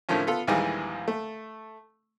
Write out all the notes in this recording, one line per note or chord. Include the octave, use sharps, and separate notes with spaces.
A2 D3 D#3 F3 C#4
B3 F4 A4
A#1 D#2 E3 G3 G#3 G#5
A3